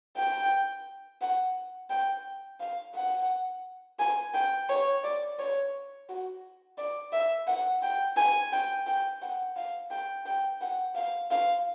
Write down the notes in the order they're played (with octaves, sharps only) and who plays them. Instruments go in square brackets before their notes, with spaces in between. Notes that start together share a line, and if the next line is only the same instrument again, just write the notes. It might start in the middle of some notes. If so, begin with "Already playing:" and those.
[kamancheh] G5
F#5
G5
F5
F#5
G#5
G5
C#5
D5
C#5
F#4
D5
E5
F#5
G5
G#5
G5
G5
F#5
F5
G5
G5
F#5
F5
F5